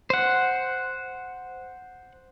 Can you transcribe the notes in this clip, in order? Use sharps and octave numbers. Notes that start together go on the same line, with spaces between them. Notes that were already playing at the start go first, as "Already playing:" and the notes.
C5 F#5